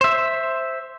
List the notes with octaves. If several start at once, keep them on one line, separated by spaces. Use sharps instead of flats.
C5 E5